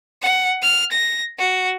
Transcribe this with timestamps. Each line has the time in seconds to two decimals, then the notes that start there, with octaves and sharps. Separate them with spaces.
0.22 F#5
0.62 F6
0.91 A#6
1.38 F#4